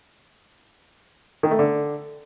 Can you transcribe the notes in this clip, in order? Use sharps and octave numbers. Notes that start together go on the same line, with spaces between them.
D#3
A3
D3